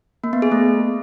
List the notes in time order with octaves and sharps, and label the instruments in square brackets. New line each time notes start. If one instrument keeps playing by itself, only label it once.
[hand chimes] A#3
B3
G#4
A3